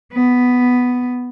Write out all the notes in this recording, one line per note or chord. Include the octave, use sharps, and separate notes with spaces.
B3